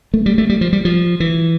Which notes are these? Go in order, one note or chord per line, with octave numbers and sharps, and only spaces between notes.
A3
G3
A3
G3
F3
G3
F3
E3